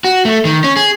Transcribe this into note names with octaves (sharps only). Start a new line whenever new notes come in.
F#4
A3
D#3
C#4
G#4